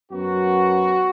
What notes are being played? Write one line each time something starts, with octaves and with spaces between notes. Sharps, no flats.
F#2 F#3 B3 F#4